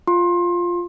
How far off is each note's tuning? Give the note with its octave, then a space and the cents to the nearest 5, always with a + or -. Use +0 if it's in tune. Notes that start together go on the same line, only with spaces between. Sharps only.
F4 +0 C6 +25